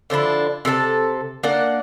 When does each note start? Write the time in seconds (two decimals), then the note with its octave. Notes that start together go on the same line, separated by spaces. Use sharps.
0.10 D3 F3 D4 E4
0.65 C3 A4 A#4 A5
1.43 A#3 D4 D5 F#5